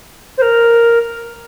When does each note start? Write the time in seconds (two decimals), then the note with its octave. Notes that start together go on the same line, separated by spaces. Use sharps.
0.37 C5
0.41 A#4